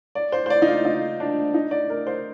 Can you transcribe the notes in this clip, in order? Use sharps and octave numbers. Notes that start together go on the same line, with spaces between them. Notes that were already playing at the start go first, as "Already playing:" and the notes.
D5
C5
C5
D5
D#4
F4
D#4
D4
D#4
D5
A#4
C5